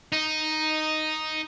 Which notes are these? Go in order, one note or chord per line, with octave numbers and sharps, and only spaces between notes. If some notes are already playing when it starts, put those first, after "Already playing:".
D#4